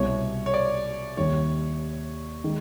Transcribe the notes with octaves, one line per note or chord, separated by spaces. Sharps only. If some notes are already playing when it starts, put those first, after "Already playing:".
Already playing: C2 B2 G3 C#5
C#5
D5
D#2 D#3 G3 C#5
D#3 G#3